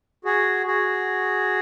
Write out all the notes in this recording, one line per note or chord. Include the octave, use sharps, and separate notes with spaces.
F#4 G#4
F#4 G#4